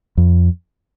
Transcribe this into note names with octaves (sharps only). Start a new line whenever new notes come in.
F2